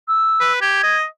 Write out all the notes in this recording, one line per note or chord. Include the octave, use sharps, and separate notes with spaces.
E6
B4
G4 G#6
D#5